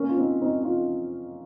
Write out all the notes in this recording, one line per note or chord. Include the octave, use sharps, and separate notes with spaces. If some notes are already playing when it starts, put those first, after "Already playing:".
Already playing: A#3 C#4
F4
C4 D#4
C4 D#4
D#4
C#4 F4